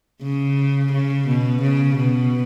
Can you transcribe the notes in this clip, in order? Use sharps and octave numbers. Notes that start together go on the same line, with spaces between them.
C#3
C#3
B2
C#3
B2